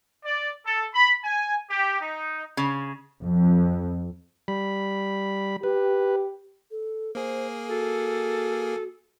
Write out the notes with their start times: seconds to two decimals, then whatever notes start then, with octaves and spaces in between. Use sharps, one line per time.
0.24 D5
0.65 A4
0.94 B5
1.23 G#5
1.70 G4
2.00 D#4
2.57 C#3
3.22 F2
4.48 G3 B5
5.63 G4 B4
6.71 A4
7.15 A#3 G#4 C5
7.69 F#4 A4